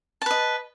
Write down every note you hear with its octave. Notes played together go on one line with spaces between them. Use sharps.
B4 D#5 A5